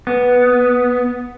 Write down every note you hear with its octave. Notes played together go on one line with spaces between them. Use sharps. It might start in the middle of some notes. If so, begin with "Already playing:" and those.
B3